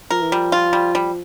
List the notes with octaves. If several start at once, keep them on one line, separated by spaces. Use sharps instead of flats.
F3 A#4
E3
F3 G3
F4
G3
G3